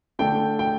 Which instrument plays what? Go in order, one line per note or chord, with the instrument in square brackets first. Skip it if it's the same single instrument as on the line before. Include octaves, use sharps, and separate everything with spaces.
[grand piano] D3 A3 D4 A4 [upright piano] G5
[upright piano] G5